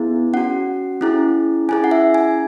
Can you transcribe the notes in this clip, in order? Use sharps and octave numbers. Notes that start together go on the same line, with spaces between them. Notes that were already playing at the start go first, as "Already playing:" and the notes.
Already playing: B3 E4 G#4
C#4 F#4 F#5
C#4 E4 G#4
C#4 E4 G#4 G#5
F#5
E5
G#5